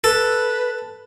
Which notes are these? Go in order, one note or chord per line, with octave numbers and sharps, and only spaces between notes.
A4 B4